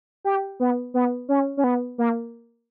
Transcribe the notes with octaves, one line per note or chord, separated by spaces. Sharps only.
G4
B3
B3
C#4
C#4
B3
A#3